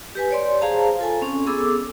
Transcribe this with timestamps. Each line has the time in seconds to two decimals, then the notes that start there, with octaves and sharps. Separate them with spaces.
0.15 G4 B4 G#5
0.31 C#5 D5 C6
0.61 G#4 C5 F5 A5 A#5
0.99 F4 A4 G#5
1.21 C4 C#4
1.47 B3 G#4 A4 D6 E6